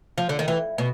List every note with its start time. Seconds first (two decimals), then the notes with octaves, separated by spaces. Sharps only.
0.18 F3
0.29 D3
0.39 D#3
0.48 E3
0.78 B2